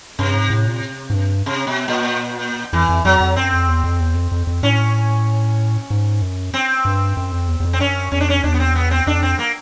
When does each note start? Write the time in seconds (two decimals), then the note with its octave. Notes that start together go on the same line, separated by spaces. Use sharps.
0.19 G2 C3
0.34 G#2
0.50 A2
0.67 A#2
1.10 G#2
1.14 G2
1.46 C3
1.67 B2
1.88 A#2
2.73 F2 E3
2.89 F2
3.05 F2 F#3
3.20 F2
3.36 F#2 C4
3.52 F2
3.68 E2
3.84 F2
4.00 E2
4.15 F2
4.32 F2
4.47 F2
4.63 A2 C#4
5.90 G#2
6.22 F#2
6.54 C4
6.85 G2
7.17 F#2
7.32 F2
7.48 E2
7.60 E2
7.65 F2
7.73 C4
7.80 F#2 C#4
8.12 F2 C#4
8.21 D4
8.30 C#4
8.44 E2 D4
8.54 B3
8.60 C4
8.76 B3
8.91 C4
9.07 F2 D4
9.23 C4
9.39 A#3